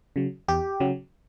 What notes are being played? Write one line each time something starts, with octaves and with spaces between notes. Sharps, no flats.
C#3 F#3
E2 G4
C#3 F#3